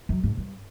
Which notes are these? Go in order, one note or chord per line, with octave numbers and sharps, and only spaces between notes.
F#2
G#2
G2